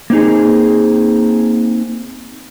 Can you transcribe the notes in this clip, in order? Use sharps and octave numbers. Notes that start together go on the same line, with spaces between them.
A#3 C4 D#4 G#4